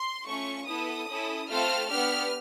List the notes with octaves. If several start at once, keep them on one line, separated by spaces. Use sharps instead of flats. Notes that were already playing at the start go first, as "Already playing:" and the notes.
Already playing: C6
A3 C#4 F4 C#6
B3 E4 A4 D#6
C#4 E4 A4
A3 C4 F4 A4 F6
B3 D4 G4 F6